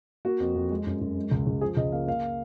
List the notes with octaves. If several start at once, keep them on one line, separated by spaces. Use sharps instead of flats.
A#3 F#4
F2
F2
G#3
F#2
F#2
G#3
C#2
C#2
F3 G#4
C#2 D#5
A#3 F5
A#3 F5